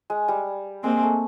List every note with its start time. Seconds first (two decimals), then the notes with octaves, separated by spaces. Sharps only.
0.10 G#3
0.28 G3
0.84 G#3 A#3 C4
1.03 A3